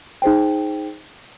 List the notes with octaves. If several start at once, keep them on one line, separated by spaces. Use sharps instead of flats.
D#4 G#4 C5 G5